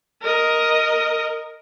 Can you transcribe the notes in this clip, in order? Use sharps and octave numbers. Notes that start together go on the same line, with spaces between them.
A#4 D#5